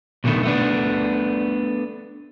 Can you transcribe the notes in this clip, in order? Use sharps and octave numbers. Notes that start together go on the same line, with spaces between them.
B1 B2 D3 D#3 A3
A3 B3 D4